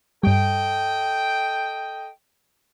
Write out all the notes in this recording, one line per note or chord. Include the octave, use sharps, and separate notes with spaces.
G2 G3 A4 D#5 G5